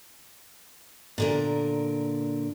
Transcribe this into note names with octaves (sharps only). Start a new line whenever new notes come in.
A#2 D3 A#4